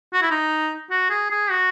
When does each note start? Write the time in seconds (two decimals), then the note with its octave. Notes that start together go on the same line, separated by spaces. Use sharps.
0.13 F#4
0.22 E4
0.31 D#4
0.90 F#4
1.10 G#4
1.30 G#4
1.50 F#4